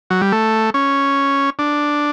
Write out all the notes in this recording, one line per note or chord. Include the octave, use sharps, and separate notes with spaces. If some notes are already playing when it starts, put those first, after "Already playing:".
F#3
G3
A3
C#4
D4